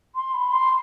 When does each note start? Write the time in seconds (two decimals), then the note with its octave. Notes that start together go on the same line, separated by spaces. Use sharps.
0.15 C6
0.34 B5
0.52 C6